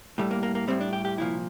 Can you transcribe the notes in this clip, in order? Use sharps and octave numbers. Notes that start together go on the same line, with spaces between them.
A2 G3 A3
A#3
A#3
A#3
A2 G3 C4
D4
G4
G4
C2 A#2 F3 E4